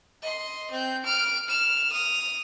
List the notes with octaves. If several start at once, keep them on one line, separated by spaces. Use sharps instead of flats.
D#5 C6
C4 G6
F6 D7
F6 E7
D#6 F7